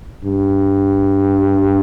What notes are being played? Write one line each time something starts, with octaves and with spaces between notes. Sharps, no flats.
G2